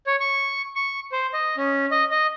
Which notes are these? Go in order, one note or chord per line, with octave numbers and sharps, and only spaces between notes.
C#5
C#6
C#6
C5
D#5
C#4
D#5
D#5